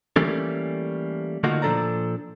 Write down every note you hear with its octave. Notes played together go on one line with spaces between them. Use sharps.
E3 G3 A3 A#3 C#4 A4
D3 A3 A#3 D#4 F4 F#4
A#2 F3 D4 A4 D5 A#5